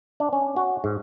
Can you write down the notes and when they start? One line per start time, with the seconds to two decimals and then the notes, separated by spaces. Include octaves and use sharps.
0.20 D4
0.33 C#4
0.56 F#4
0.84 G#2